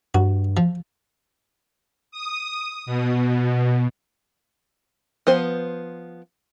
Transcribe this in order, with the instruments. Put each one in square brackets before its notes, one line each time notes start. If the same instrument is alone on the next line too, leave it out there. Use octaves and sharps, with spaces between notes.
[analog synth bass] G2 [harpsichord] F#4
[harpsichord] F3
[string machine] D#6
B2
[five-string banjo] F3 B3 C5